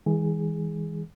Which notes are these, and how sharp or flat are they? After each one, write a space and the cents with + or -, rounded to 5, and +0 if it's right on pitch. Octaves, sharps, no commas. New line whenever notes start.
E3 -40 G#3 -30 G#4 +0